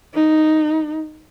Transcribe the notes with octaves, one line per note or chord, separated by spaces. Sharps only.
D#4